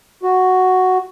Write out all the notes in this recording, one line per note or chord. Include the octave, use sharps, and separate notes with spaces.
F#4